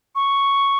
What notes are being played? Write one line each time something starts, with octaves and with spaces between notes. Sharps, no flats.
C#6